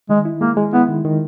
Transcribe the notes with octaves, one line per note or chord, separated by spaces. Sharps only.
D#3 G#3
E4
G#3 A#3
G#3
B3 E4
D#3
D#3